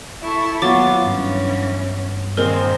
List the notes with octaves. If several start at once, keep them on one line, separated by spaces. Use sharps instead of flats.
E4 A4 C#6
D#2 F#3 B3 F4 D6 A6
G2 E3 C#4
A#2 D#3 G#3 C4 A#4